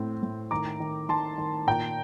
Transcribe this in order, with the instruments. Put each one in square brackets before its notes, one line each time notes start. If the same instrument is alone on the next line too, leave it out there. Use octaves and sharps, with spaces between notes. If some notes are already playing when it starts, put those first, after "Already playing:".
Already playing: [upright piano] A2 C4
A2
D#3 A#5 D6
D#3
D#3 A5 C6
D#3
A#2 G5 A#5